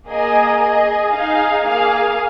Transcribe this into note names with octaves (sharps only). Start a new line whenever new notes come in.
A#3 G#4 D#5 G#5
G#4 D#5 G#5
D#4 G#4 F5 G#5
A#3 G#4 F5 G#5